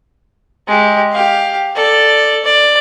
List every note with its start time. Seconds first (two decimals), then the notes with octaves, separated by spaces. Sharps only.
0.68 G#3 G4
1.12 G4 F5
1.75 A4 D5
2.45 D5